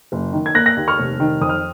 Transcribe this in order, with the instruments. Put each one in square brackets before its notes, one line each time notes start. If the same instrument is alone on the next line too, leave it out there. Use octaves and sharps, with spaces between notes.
[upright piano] F#1
D#3
G#6
A#3 F#6 A#6
F#6 A#6
D#2
C#6 F6
F1
D#3
F2 D#6
F6